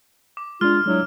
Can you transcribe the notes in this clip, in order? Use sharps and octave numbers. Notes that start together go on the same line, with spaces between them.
D6
G#3 D4 F4 F6
F#3 G#3 D4 E4